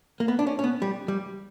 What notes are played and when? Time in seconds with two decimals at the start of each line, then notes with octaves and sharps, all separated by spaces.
0.20 A#3
0.28 B3
0.39 D4
0.47 C#4
0.59 C#4
0.64 B3
0.82 G3
1.08 G3